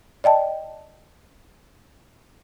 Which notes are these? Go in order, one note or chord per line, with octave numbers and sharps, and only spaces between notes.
D5 D#5 G5 A5